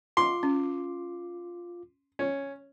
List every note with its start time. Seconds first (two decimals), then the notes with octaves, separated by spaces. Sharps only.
0.17 F4 C6 D6
0.43 C#4
2.19 C#4